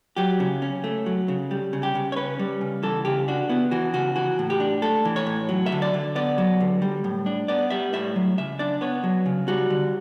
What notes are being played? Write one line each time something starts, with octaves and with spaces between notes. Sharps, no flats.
F#3 G4
C#3
C#4
A3
F#3
C#3
G3
C#3
G4
C#3
C#5
C#4 B4
G3
C#3
E3 A4
C#3 G4
D4 F#4
B3 E4
E3 F#4
C#3 F#4
E3 F#4
A2
G4
D4
A3 A4
E3
C#5
A2
F#3
E5
D3
D5
D3
B3 D5
F#3
D3
G3
A2
D4
B3 D5
G3 E5
A2 E5
F#3
C#3 E5
D4 D5
B3 C#5
F#3
C#3
G3 F#4
D3